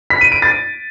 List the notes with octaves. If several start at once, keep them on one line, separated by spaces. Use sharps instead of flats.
B6
D#7
D7
A6